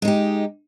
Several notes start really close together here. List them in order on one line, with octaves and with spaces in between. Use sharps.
G#3 D#4 G4